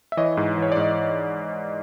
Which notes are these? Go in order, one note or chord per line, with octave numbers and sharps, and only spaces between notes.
E5
E3 C#5 D#5
G#2
E3
C#5
D5
G#2 D#5